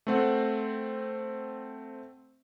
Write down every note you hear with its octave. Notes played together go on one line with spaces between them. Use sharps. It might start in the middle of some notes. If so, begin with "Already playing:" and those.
A3 C4 F#5